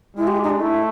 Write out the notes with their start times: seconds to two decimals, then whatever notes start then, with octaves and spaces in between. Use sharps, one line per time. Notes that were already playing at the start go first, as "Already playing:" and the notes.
0.17 G#3 E4
0.27 G4
0.43 D#4
0.49 D4
0.59 A3 E4